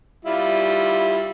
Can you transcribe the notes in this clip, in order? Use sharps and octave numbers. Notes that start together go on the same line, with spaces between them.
G3 E4 F4